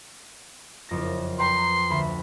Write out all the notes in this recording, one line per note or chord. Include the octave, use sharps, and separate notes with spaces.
F#1 F2 A#6
B4 G5 A#5 C6
D2 B5